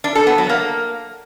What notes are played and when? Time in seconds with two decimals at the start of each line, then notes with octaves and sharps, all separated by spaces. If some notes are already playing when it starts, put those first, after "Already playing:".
0.04 D4
0.15 A4
0.27 B3
0.38 F#3
0.49 A#3